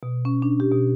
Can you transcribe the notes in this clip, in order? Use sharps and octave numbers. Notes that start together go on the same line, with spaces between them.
B2
C#4
D4
G4
B2